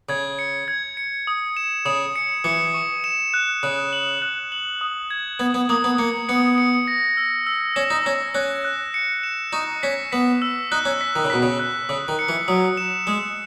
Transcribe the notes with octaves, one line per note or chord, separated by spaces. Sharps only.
C#3 G#6
C#7
G#6
C#7
D#6
E7
C#3 D#6
C#7
E3 C#7
C#6
E7
F#6
C#3 F#6
F#7
F#6
F#7
D#6
G#6
B3 G#6
B3
A#3 D#6
B3
A#3 C#7
B3 C#7
C#7
A#6
E6
E6
C#4 E7
D#4
C#4 E6
C#4 F#6
F#6
C#7
E7
D#4 C#6
C#4 B6
B3 B6
E6
D#4 F#6
C#4
B6
D#3
C#3
B2 B6
C#3
F#6
C#3 D#6
D#3
C#7
E3
F#3 D#6
E7
G#3 D#6